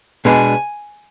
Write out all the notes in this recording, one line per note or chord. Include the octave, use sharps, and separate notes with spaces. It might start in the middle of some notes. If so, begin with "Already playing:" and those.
B2 G#3 B3 D4 G#5